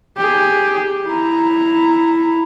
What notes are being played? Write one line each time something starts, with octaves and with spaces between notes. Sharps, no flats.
G4 G#4
E4 A#5